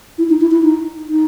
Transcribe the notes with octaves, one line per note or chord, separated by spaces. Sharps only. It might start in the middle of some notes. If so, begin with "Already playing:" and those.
E4
D#4
E4
E4
D#4
D#4